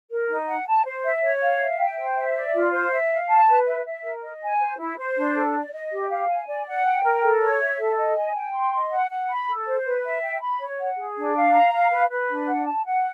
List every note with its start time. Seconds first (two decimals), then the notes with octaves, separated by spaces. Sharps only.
0.10 A#4
0.29 D#4
0.47 F#5
0.67 A5
0.85 C5
1.04 E5
1.23 C#5
1.42 F5
1.60 E5
1.78 G5
1.98 C5
2.16 E5
2.35 D5
2.54 F4
2.72 C5
2.92 E5
3.10 F5
3.29 A5
3.47 B4
3.67 E5
3.85 E5
4.04 A#4
4.22 D#5
4.42 G#5
4.60 C5
4.79 E4
4.98 C5
5.16 D4
5.35 A4
5.54 D5
5.72 D#5
5.92 G4
6.10 F5
6.29 G#5
6.47 D5
6.67 F#5
6.86 G5
7.04 A#4
7.23 A4
7.42 C#5
7.60 E5
7.79 A4
7.98 D#5
8.16 G#5
8.35 G5
8.53 C6
8.73 D#5
8.91 F#5
9.10 F#5
9.29 B5
9.48 A4
9.67 C5
9.86 B4
10.04 E5
10.23 G5
10.41 B5
10.61 C#5
10.79 F#5
10.97 G#4
11.17 D4
11.35 F5
11.53 A#5
11.73 F5
11.91 B4
12.10 B4
12.29 D4
12.48 F#5
12.66 A5
12.85 F#5